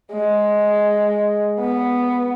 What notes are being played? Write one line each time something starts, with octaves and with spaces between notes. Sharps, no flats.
G#3
B3